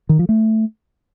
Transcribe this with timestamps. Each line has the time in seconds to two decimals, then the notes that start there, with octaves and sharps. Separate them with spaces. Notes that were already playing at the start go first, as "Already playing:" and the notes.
0.09 D#3
0.19 F3
0.29 A3